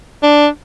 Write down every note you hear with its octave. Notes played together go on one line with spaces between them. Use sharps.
D4